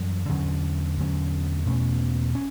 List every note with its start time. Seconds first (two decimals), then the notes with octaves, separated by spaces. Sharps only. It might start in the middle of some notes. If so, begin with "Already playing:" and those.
Already playing: F#2 E3 G3
0.29 E2 D3 F#3 C#4
0.98 E2 D3 F#3 C#4
1.66 E2 B2 A3 C#4
2.35 C#4